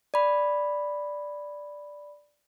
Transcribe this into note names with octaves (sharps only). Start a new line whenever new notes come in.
D5 B5